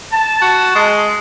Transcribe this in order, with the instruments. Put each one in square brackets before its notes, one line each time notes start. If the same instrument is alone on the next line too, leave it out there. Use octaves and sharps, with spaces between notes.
[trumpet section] A5
[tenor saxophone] F#4
G#3